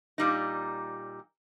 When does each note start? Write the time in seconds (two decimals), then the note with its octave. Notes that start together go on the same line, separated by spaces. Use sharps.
0.18 A#2 G3 D#4